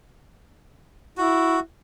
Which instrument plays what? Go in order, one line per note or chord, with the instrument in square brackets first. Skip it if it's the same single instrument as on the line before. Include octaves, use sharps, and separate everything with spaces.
[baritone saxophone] E4 [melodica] F#4